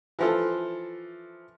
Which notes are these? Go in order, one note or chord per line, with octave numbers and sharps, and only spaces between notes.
E3 F3 A4